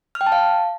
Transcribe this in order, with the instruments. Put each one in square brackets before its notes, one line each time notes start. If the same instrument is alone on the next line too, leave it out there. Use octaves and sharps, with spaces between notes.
[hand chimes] F6
G5
A5
F5